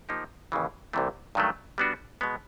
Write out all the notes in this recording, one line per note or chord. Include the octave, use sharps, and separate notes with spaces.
F3 A#3 D#4 G4
D#2 C#3 E3
C2 C3 E3 A3
G2 D#3 F#3 A3
G3 B3 D4 F#4
B2 G#3 B3